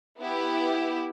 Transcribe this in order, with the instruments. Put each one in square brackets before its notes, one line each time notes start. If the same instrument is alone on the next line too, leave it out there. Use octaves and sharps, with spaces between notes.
[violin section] B3 E4 G4